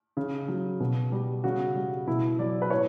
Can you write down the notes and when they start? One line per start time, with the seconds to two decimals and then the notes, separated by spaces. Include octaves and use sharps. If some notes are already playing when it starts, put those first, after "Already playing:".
0.17 C#3
0.48 F#3
0.80 B2
1.12 G3
1.44 C#3 F#4
1.76 G3
2.07 B2 E4
2.39 F#3 D5
2.62 B4
2.70 A2 C#5